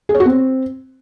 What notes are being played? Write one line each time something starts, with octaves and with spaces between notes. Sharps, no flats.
G#4
C#5
F#4
C4